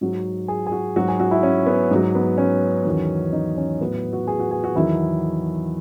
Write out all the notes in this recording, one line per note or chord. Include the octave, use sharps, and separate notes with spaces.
G#2 F#3 F#4
G#4
G#4
F#4
G#2 F#3 F#4
G#4
F#4
E4
C#4
B3
G#2 F#3
B3
C#4
E2 D#3 F#3
D#4
C#4
A2 F#3 B3
F#4
G#4
F#4
G#4
F#4
E2 D#3 F#3 E4